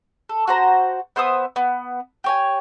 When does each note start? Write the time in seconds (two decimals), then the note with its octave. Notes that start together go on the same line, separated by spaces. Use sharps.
0.29 A4
0.48 F#4 C5 A#5
1.16 B3 C5 E5 D#6
1.56 B3
2.24 G4 C#5 G#5